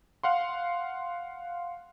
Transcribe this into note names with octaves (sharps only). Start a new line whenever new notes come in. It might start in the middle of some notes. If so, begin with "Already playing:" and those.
F5 F#5 C6